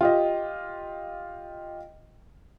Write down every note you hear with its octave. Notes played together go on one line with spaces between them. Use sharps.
F4 G4 D#5